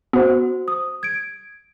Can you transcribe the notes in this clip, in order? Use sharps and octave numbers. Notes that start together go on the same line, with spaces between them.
B3 F#4 C5
D#6
G#6 D7